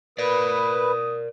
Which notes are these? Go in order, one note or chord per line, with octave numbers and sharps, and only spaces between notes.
A#4 B4 D5 D#6